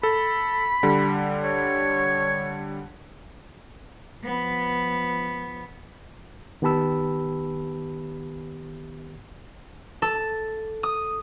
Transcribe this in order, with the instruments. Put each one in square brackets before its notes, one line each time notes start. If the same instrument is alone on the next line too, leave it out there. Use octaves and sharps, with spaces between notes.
[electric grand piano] A4 [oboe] B5
[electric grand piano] D3 G3
[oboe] C#5
[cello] F3 B3
[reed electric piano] D#3 B3 G4 A5 B5 E6
[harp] A4
D#6